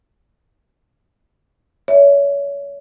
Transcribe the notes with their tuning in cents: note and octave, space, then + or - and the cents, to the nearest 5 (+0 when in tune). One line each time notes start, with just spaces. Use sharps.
C#5 +30 E5 +0